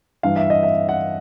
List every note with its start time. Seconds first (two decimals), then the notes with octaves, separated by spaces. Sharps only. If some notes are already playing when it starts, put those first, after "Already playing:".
0.23 G2 E3 F5
0.36 E5
0.50 D#5
0.63 E5
0.89 F#5